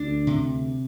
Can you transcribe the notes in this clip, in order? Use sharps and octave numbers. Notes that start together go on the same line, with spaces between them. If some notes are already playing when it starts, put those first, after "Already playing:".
Already playing: D2 D4
C3